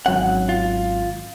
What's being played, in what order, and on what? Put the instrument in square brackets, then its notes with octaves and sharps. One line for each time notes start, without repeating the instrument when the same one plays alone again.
[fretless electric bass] G#1 F#3 C#4 [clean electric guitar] F#5
[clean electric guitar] F4